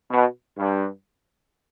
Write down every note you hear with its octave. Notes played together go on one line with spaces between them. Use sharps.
B2
G2